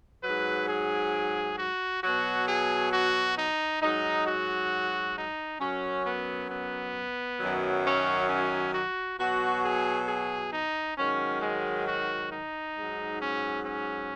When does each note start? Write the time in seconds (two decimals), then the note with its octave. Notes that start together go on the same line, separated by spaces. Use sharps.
0.23 G#2 F#3 B4
0.69 G#4
1.58 F#4
2.03 B2 F#3 F#4
2.48 G#4
2.93 F#4
3.38 D#4
3.82 G#2 F#3 D#4
4.27 F#4
5.17 D#4
5.61 F#2 F#3 C#4
6.06 B3
6.50 B3
7.40 F#2 D#3 F#3
7.85 C#4
8.29 C#4
8.74 F#4
9.19 B2 F#3 F#4
9.64 G#4
10.08 G#4
10.53 D#4
10.97 G#2 D#3 F#3 C#4
11.42 G#3
11.88 F#4
12.32 D#4
12.77 G#2 F#3
13.22 C#4
13.66 C#4